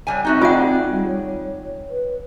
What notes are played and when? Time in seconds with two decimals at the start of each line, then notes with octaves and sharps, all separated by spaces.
0.07 F#3 G3 G#5
0.25 C4 D#4 F#4 E5
0.42 D#3 F4 G#4 D5 F#5
0.91 G3
1.07 C#5
1.90 B4